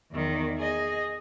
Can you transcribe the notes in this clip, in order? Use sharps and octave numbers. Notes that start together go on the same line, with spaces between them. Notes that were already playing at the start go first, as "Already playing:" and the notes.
E2 D#3
G#4 D#5